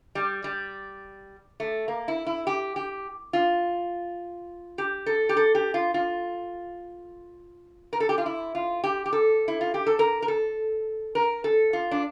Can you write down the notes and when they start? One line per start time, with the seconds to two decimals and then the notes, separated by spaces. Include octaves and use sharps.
0.15 G3
0.44 G3
1.60 A3
1.88 A#3
2.08 E4
2.27 E4
2.47 G4
2.76 G4
3.33 F4
4.78 G4
5.06 A4
5.29 G4
5.37 A4
5.55 G4
5.74 F4
5.94 F4
7.93 A#4
8.00 A4
8.09 G4
8.18 F4
8.26 E4
8.55 F4
8.84 G4
9.06 G4
9.13 A4
9.48 E4
9.61 F4
9.74 G4
9.86 A4
9.99 A#4
10.22 A#4
10.28 A4
11.15 A#4
11.44 A4
11.73 F4
11.91 D4